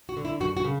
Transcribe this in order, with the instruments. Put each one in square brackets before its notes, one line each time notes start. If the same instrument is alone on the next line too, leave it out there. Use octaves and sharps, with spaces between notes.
[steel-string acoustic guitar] F#4
D3
E4
F#2 F#4
F#4
C#3